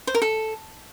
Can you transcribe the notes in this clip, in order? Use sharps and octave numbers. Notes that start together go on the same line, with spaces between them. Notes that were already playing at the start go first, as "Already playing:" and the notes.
C5
A#4
A4